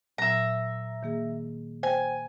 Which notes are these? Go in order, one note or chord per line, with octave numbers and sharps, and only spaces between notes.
A#2 F#3 E5 A#5
D#3 A#3 G#4
C5 G5 G#5